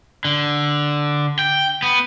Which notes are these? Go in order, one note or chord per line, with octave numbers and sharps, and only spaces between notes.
D3
G5
B3